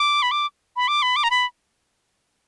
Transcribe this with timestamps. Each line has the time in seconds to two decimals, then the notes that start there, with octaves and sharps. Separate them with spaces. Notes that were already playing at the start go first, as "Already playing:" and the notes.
Already playing: D6
0.22 B5
0.31 D6
0.76 B5
0.88 D6
1.02 B5
1.16 D6
1.23 A#5
1.30 B5